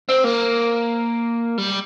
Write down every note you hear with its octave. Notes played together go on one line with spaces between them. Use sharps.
C4
A#3
G3